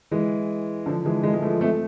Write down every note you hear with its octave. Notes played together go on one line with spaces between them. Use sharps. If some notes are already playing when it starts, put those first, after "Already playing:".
E3 G#3
D3 F3
E3 G#3
E3 G#3
G#3
F3 A3
A3 C4